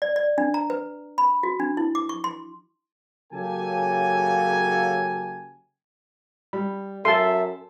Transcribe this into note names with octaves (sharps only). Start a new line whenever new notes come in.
D5
D5
D4
A#5
B4
B5
F#4
D4
E4
D6
C#6
C6
C#3 F#3 A#3 G4 A4 G#5
G3 B5
F#2 A4 E5 A5 C6